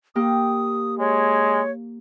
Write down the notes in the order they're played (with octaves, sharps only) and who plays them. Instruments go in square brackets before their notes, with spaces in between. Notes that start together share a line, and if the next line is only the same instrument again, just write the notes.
[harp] A#3 G4 [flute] D#6
[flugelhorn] G#3 [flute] C#5